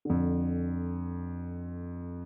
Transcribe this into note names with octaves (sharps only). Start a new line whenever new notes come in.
F2 D3